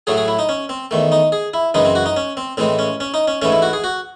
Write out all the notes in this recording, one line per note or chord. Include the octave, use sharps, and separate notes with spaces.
A2 F#3 A3 G#4
G#4
E4
D#4
C#4
C4
E2 D#3 A3
D#4
G#4
E4
F#2 C#3 E3 G#3 D#4
C4
F#4
D#4
C#4
C4
A2 E3 G#3 C4
C#4
C#4
D#4
C#4
G#2 E3 A3 C#4
E4
F#4
G#4
F#4